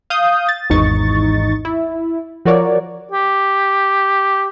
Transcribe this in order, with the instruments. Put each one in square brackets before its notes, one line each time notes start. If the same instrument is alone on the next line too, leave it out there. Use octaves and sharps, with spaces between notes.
[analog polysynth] F5 D#6 G6
A6
G#1 E2 G#2 D#4 C#6 A6
E4
F3 F#4 A#4 C#5 D5
[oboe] G4